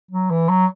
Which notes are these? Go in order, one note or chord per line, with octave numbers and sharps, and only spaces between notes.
F#3
E3
F#3